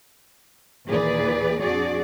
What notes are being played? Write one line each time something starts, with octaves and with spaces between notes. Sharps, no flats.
D#2 A#2 E3 G#4 B4 D5
F2 D4 F#4 G#4 D5